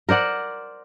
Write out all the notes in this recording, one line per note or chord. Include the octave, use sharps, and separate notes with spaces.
A#4 C5 D5 F#5